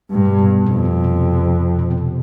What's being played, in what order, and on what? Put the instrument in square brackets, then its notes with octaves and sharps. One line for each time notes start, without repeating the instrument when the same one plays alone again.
[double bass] G2
[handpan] B2
B2
[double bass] F2 [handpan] B2
[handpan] B2
C3
B2
C3
B2